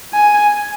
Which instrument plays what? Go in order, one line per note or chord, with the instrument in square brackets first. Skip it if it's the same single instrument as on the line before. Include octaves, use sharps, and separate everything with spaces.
[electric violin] G#5